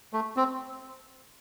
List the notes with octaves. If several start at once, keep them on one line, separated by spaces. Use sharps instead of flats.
A3
C4